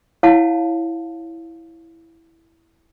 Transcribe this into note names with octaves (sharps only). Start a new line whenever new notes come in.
E4 C#5 F5 F#5 A5